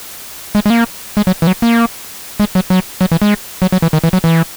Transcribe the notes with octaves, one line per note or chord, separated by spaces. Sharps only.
G#3
G#3
A#3
G#3
F#3
E3
F#3
A#3
G#3
F#3
F#3
F#3
E3
G#3
F#3
F#3
E3
D#3
E3
F#3
E3